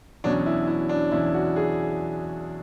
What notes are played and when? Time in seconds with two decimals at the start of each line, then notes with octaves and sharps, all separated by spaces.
0.24 E2 B2 F#3 C#4 D4
0.46 E4
0.67 E4
0.89 D4
1.11 E2 B2 F#3 C#4 E4
1.34 F#4
1.56 G#4